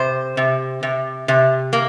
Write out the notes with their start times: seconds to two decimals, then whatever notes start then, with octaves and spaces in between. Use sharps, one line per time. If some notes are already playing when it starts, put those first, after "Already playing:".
Already playing: C3 C5
0.37 C3
0.83 C3
1.28 C3
1.73 A#3